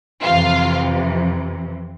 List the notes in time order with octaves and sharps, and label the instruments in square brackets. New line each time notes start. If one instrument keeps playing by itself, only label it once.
[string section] F2 C3 E3 F4 F5